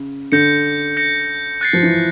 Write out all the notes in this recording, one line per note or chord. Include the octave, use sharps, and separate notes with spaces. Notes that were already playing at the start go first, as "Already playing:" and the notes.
Already playing: C#3
D3 G6 A#6 C#7
G6 A#6 C#7
F#6 A6 C7
F3
E3